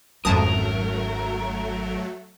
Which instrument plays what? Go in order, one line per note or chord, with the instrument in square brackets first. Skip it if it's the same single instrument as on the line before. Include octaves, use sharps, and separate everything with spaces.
[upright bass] G#1 C#4 [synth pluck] F2 A5 D#6 [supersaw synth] F#3 A3 [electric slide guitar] A#4